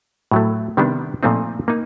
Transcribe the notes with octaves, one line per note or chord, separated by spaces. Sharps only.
A2 F#3 A3
C3 D#3 G3 B3 D4
A#2 F3 A3 C4 D#4
A#3 D#4